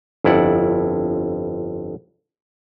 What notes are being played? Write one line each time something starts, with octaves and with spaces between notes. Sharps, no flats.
G1 F2 E4 D5 F#5